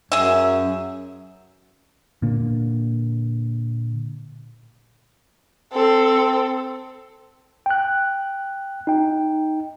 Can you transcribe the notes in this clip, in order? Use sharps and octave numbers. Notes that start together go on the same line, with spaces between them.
F#2 G#4 E5
A#2 D3 A#3
C4 A4
G5 F#6
D#4 G5